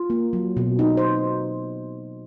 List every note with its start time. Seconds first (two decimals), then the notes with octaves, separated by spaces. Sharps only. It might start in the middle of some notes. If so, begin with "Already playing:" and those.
Already playing: F4
0.10 A#3
0.33 F#3
0.57 B2
0.79 D#4
0.97 C5